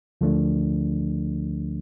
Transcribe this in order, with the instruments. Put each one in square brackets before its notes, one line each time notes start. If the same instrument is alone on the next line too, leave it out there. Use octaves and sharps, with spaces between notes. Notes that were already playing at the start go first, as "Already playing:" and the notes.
[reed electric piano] D2 D3 F3 A3 D4